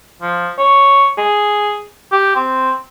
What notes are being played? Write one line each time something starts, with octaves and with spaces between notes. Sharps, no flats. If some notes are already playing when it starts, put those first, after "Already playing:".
F3
C#5
G#4
G4
C4